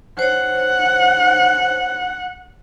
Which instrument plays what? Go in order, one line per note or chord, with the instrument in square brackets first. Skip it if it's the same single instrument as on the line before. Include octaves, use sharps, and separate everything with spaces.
[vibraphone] C5 C#5 [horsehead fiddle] F#5